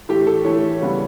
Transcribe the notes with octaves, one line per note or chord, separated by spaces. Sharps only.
A2 E3 A3 G4
A4
A2 E3 A3 C#5
C#3 G3 B3